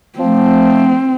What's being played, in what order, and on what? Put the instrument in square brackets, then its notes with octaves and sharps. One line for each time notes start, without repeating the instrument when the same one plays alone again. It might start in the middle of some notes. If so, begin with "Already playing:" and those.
[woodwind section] F3 A3 [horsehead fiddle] C4